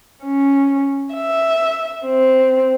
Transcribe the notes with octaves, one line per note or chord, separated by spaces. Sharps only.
C#4
E5
C4